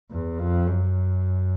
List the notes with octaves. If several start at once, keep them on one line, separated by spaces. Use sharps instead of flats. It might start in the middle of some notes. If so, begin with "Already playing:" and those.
E2
F2
F#2